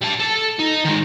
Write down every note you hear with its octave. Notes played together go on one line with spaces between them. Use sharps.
G3 A5
A4
D#4
D#3 G#3